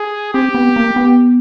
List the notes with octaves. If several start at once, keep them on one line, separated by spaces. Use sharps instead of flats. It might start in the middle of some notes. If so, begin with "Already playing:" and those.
Already playing: G#4
C4 G4
B3
A#3
B3